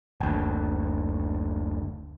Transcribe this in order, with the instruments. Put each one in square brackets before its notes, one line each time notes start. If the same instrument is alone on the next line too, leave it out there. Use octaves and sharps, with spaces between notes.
[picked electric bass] F#1 D2